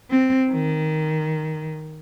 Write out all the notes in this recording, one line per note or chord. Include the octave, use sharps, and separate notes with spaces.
C4
D#3